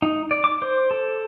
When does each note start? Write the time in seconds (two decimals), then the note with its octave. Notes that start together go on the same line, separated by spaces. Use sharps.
0.02 D#4
0.31 D5
0.44 D6
0.62 C5
0.91 A4